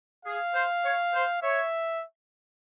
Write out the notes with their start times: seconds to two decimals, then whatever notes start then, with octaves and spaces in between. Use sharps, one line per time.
0.25 G#4 F5
0.55 C5
0.84 C#5
1.13 C5
1.42 C#5 E5